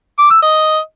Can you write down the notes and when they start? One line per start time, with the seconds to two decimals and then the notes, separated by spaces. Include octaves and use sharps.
0.19 D6
0.31 E6
0.42 D#5